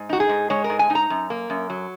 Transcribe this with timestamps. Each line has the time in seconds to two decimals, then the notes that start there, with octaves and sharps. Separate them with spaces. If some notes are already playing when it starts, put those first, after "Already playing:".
Already playing: G#2
0.09 D#4 F#4
0.20 G#4
0.29 G#2
0.50 G#3 C#5
0.64 A#4
0.70 G#2
0.79 G#5
0.90 D#4
0.95 A#5
1.10 F#2
1.30 A#3
1.50 F#2
1.70 F#3